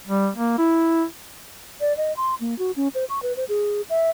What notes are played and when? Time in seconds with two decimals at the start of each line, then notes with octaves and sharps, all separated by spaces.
0.07 G3
0.35 A#3
0.58 E4
1.81 D5
1.97 D#5
2.17 C6
2.41 A#3
2.59 F#4
2.76 C#4
2.95 C5
3.09 C#6
3.23 B4
3.37 C5
3.49 G#4
3.90 E5